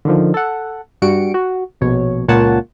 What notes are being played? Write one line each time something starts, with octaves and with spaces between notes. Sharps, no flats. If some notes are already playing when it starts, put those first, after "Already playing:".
D3 D#3 F3
A4 F#5
G2 G3 F#4 C#7 D7
F#4
A#1 B2 C#5
C#2 A#2 A#3 C#5 F#5 A5